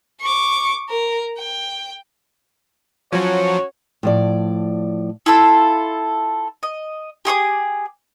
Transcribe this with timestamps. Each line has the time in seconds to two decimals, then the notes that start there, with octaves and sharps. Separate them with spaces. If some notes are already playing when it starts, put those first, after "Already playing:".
0.21 C#6 D6
0.89 A#4
1.38 G5
3.13 F3 F#3 C#4 F#4 C#5
4.03 A2 F3 D5
5.26 E4 F4 A4 E6
6.63 D#5
7.25 G4 G#4 C6 D#6